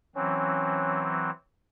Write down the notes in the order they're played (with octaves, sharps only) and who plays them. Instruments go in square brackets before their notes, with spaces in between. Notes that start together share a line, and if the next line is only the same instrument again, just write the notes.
[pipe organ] E3 F#3 C4 [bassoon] C#4